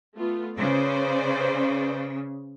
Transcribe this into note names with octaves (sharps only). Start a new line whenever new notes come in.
A3 B3 F4
C#3 B4 C5 D5